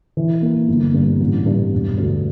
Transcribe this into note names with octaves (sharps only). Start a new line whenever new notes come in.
E3
A#3
G1
G2
A1
G2
E1
D2